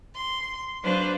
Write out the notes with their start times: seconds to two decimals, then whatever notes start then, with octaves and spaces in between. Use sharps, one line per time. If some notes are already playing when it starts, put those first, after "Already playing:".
0.15 C6
0.84 F#3 D4 B4 C5 F5